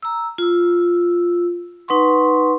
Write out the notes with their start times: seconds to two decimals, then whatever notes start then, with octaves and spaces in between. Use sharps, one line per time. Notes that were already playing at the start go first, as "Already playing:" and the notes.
0.03 A#5 E6
0.38 F4 E6
1.88 D#4 B4 F#5 C6 C#6